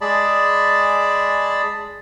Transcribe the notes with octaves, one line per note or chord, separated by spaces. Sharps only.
G#3 G#4 D5 A5 B5